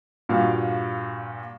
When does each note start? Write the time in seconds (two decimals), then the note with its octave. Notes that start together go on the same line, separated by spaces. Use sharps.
0.29 G2 A#2 F#4 F5